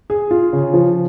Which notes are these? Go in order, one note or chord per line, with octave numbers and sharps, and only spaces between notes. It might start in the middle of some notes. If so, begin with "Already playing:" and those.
G#4
F4
C#3
F3